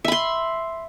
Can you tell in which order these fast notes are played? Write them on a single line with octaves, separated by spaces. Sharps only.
E5 B5 C6